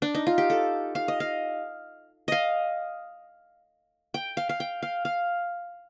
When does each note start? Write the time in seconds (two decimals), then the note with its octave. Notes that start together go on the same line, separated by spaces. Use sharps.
0.02 D4
0.15 D#4
0.27 F4
0.38 G4
0.50 A4
0.95 F5
1.08 D#5
1.20 F5
2.28 D#5 F5
4.14 G5
4.37 F5
4.49 F5
4.60 G5
4.82 F5
5.05 F5